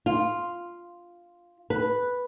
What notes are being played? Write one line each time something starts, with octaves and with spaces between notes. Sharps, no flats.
F4
B4